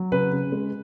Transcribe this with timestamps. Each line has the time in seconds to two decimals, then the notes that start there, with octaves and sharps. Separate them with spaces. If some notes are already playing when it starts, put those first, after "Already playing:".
Already playing: F#3
0.12 C#3 B4
0.32 C#3
0.52 G#3